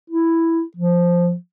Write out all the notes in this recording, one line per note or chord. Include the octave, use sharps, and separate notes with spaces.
E4
F3